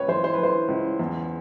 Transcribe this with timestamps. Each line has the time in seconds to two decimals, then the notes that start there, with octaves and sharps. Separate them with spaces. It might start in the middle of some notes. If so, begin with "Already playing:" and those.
Already playing: C#2 B4 C#5
0.08 E3 C5
0.24 C5
0.34 E3 B4
0.43 C5
0.68 C#2
0.99 E2